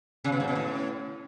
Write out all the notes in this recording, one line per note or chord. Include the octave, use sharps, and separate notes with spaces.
C#3
B2
G#2
B2
A2